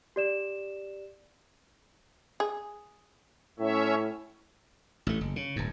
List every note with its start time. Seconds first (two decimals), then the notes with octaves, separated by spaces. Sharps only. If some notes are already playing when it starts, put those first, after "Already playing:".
0.16 G4 D5 E7
2.40 G#4
3.59 A2 C#4 C#5 E5
5.07 A1 A3
5.21 F#1
5.36 C#3
5.56 D1 G2